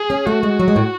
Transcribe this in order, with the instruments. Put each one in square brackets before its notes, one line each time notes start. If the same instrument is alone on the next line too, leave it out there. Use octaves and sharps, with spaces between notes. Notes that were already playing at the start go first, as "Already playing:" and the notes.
Already playing: [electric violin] G#4
[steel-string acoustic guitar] C#4
[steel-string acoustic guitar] A3 [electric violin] F#4
[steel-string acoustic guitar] G#3
F#3
G#3
A2